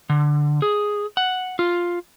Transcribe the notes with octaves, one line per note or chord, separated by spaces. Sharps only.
D3
G#4
F#5
F4